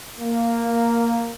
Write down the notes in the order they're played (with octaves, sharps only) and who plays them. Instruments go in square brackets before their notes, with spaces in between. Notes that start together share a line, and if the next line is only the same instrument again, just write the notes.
[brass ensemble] A#3